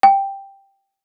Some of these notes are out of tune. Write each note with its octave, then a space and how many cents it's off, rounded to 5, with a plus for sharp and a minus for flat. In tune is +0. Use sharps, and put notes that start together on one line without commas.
G5 +5